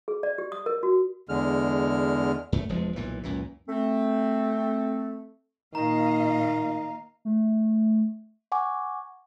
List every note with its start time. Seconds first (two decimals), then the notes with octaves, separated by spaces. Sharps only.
0.08 G#4
0.23 D5
0.38 G4
0.52 D#6
0.66 A#4
0.83 F#4
1.29 E2 D3 G#3 F6
2.52 F#2 A3
2.69 E1 F3 G#3
2.96 B1 A#2 E3
3.23 C#2 F#2 A#2 E3
3.69 A3 C4
5.75 A#2 D#3 D#5 F5 A#5
7.25 A3
8.52 F#5 G#5 C#6 D6